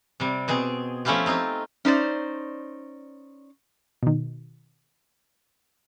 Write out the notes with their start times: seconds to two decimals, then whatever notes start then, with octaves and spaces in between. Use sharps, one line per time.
0.20 C3 G3
0.48 B2 C4 G#4
1.05 F3 A3 C#4 E4 F4 G4
1.26 C4 D#4 F4 G4
1.85 C#4 D#4 C5 D5
4.03 B2 D#3